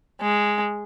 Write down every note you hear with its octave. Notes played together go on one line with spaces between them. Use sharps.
G#3